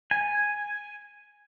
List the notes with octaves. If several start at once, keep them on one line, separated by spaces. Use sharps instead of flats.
G#5